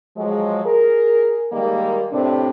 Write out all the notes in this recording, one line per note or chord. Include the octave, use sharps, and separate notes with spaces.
F3 F#3 G#3
G#4 A#4
D#3 G3 G#3 A#3
A2 C3 C4 D4